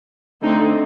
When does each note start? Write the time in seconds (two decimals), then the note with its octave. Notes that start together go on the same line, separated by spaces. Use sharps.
0.42 D3 A3 C4 D#4